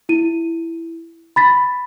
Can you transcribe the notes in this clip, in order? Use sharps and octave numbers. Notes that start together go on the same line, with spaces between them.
E4 D#7
B5 A6 B6